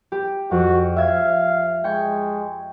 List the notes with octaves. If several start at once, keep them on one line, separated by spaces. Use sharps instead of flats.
G4
F2 F#4
E5 F5 G#6
G#3 G5 C#6 G#6